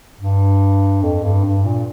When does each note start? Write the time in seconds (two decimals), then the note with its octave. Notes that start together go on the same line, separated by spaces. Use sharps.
0.20 G2
1.02 F2
1.23 G2
1.44 G2
1.65 A#2